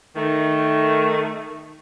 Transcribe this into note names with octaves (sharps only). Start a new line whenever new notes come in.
D#3 A3